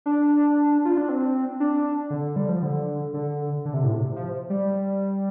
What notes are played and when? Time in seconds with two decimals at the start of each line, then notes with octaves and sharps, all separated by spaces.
0.06 D4
0.85 F4
0.98 D4
1.09 C4
1.60 D4
2.10 D3
2.36 G3
2.49 F3
2.62 D3
3.14 D3
3.65 D3
3.74 C3
3.84 A2
3.93 C3
4.16 F3
4.50 G3